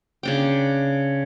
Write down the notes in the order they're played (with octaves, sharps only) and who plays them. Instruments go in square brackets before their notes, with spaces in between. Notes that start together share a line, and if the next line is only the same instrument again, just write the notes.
[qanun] C#3 D4 G5